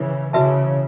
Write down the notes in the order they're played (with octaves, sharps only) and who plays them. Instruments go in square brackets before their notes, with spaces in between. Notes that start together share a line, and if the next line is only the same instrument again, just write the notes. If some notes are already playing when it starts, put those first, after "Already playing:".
Already playing: [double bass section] C#3 E3
[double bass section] C#3 E3 [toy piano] F#4 B4 E5 A5